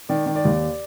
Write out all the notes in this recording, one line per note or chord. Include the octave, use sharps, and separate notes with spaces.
D#3 D5
D#3
D5
D#2